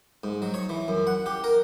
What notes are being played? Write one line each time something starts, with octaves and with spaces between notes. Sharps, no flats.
G#2
F#3
C#5
E3
F#2
F#5
G4
A#4